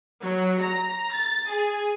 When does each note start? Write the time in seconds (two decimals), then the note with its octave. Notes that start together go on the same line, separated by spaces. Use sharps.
0.22 F#3
0.61 A#5
1.12 A6
1.48 G#4